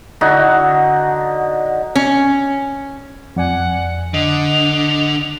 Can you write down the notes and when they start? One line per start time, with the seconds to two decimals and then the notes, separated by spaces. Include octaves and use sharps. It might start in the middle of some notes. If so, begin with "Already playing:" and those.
0.21 D3 D#4 F#4
1.95 C#4
3.36 F2 D5 F#5 G#5
4.14 D3 D#5 D#6 F#6 F7